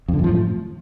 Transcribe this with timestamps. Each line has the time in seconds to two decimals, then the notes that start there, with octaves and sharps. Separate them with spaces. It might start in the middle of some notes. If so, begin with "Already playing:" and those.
0.08 F2
0.14 D3
0.19 F#2
0.24 F3
0.29 A2